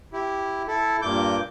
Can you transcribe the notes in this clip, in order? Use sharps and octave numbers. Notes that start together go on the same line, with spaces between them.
E4 G4
E4 A4
G2 A#2 D6 G6